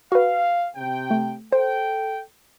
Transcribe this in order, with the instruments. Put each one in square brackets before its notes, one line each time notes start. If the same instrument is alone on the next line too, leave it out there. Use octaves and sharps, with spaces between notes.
[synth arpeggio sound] F#4 B4 [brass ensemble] F5
[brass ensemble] C3 G5
[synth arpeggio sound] A3
[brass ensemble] A4 G5 [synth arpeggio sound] C5